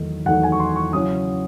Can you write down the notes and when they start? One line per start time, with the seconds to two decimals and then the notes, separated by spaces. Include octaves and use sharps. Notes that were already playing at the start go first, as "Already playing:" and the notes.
Already playing: E2 D#3 F#3 A3 D#4
0.26 E2 D#3 F#3 A3 D#4 F#5
0.43 G#5
0.52 C#6
0.60 C6
0.76 C#6
0.93 C#3 F#3 C#4 E4 D#6